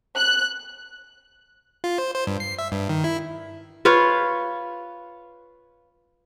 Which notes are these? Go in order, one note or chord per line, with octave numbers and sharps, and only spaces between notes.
F#6
F4
C5
C5
G2
C7
E5
G2
D#3
E4
F4 B4 C#5 F5